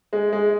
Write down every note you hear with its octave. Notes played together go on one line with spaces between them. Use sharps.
G#3
G#3